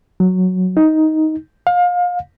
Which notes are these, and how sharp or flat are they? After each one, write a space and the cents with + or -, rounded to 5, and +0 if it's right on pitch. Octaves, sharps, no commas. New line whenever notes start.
F#3 -5
D#4 +10
F5 +30